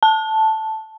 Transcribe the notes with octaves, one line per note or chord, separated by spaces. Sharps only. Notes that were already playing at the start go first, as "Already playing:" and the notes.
A5